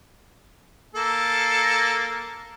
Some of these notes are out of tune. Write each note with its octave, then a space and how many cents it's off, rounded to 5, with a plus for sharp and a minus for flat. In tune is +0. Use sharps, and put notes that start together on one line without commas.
A#3 +0 A4 +0